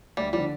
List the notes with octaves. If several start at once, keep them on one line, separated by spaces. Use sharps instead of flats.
D2 G3
D3 F3 G3